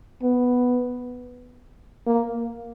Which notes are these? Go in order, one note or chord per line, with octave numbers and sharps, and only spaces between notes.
B3
A#3